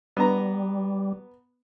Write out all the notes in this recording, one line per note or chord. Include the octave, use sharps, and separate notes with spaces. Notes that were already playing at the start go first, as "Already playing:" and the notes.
G3 B3 A#5